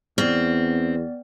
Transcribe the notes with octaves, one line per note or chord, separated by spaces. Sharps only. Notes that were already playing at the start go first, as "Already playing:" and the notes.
E2 B3 C4 D5